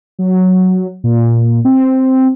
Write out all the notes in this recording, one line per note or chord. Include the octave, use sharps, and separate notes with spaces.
F#3
A#2
C4